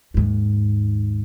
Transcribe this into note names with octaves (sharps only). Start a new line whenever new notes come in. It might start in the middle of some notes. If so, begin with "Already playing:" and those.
D#2 G#2